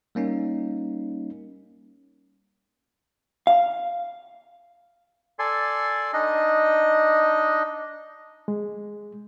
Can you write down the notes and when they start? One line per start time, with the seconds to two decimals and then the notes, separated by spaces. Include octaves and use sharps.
0.15 G3 A#3 C#4 D#4
3.47 F5
5.39 A4 D5 G#5 C6
6.13 D4 D#4 D#5
8.48 G#3